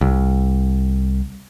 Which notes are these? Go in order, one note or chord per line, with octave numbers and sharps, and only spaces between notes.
C2